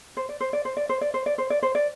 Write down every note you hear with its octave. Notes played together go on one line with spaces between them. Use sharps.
C5
D5
C5
D5
C5
D5
C5
D5
C5
D5
C5
D5
C5
D5